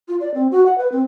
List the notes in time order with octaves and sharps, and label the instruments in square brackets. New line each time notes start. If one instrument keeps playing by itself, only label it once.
[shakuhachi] F4
D5
C4
F#4
F#5
B4
C4